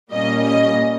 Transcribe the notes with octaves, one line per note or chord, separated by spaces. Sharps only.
A#2 G3 A#3 C#4 D#5
D#5